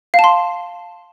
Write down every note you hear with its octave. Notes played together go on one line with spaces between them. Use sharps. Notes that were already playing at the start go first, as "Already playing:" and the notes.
F5
A5
C6